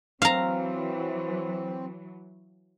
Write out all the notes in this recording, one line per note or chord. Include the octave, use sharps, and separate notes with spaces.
E3 F#3 C4 F5 A#5